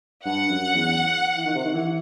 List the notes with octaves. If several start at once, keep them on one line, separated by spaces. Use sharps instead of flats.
G2 F#5
F#2
E2
E3
D#3
C3
D#3
E3